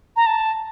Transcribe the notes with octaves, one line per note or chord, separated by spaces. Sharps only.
A#5
A5